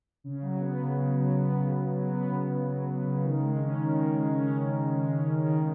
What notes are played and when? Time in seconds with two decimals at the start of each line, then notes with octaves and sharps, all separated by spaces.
0.24 C#3
0.42 F#3
0.60 B3
0.80 C#3
0.98 C#3
1.17 F#3
1.36 B3
1.55 C#3
1.73 C#3
1.92 F#3
2.10 B3
2.28 C#3
2.47 C#3
2.66 F#3
2.85 B3
3.04 C#3
3.23 D#3
3.41 G#3
3.59 C#4
3.79 D#3
3.97 D#3
4.15 G#3
4.34 C#4
4.52 D#3
4.72 D#3
4.90 G#3
5.08 C#4
5.27 D#3
5.46 D#3